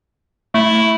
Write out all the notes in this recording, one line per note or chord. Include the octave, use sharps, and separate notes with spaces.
A3 E4